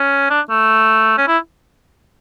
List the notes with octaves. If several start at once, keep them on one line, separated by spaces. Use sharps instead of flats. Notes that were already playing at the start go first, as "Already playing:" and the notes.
Already playing: C#4
D4
A3
C#4
E4